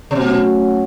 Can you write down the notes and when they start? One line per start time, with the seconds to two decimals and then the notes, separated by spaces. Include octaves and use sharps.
0.11 C3
0.15 B2 F#3 A3 C#4 F#4